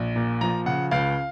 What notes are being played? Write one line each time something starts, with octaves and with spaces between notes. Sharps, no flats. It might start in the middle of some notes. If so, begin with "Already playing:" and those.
Already playing: A#1
A#2
F3 A#5
C#3 F#5
C#2 F5